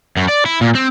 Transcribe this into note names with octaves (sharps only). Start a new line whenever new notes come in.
F#2
D5
E4
A#2
C4